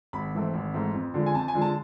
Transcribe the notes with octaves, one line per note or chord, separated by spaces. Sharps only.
G#1 B5
G#2 E3 A3 C4
G#1
G#2 E3 A3 C4
F2
D3 F3 G#3
G#5
F2 A5
G#5
D3 F3 G#3
A5